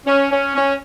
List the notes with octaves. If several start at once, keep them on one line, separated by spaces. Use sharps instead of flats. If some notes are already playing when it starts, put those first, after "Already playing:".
C#4
C#4
C#4